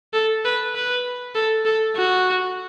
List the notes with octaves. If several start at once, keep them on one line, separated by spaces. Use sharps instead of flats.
A4
B4
B4
A4
A4
F#4